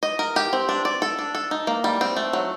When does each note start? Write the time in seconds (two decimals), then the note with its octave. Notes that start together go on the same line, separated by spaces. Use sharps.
0.03 D#5
0.19 A#4
0.36 G4
0.53 C4
0.69 D4
0.85 D5
1.02 A4
1.19 D4
1.35 A4
1.51 D#4
1.67 A#3
1.84 G3
2.01 C4
2.17 A3
2.33 F#3